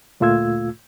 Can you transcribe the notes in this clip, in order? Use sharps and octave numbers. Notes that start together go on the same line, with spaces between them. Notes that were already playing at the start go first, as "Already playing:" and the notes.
D2 A#2 A3 F4 E6 G#6